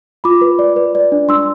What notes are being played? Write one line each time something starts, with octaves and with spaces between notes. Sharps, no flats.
F4 B5 D6
B4
D5
B4
D5
D4
D4 C6 E6